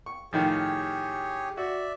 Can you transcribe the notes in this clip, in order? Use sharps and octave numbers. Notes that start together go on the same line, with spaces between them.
C#6
A2 D#3 F3 G4 G#4 C#5
F#4 D5 E5